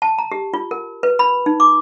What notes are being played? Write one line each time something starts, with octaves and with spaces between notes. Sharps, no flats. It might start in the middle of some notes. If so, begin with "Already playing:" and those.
A5
A#5
G4
F4
A#4
B4
B5
D#4
D6